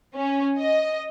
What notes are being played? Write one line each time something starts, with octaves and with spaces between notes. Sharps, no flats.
C#4
D#5